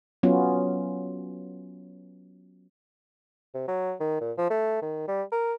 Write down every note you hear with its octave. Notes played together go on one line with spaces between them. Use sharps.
F#3 B3 C#4 F4
C3
F#3
D#3
A#2
F3
A3
D#3
G3
A#4